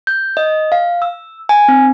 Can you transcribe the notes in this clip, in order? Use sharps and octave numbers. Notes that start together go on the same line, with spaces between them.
G6
D#5
F5
E6
G#5
C4